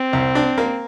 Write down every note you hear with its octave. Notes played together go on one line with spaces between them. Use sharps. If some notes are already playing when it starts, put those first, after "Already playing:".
Already playing: C4
C2
D4
A#3